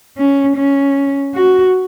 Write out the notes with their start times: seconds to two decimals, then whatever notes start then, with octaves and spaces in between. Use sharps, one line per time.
0.18 C#4
0.56 C#4
1.35 F#4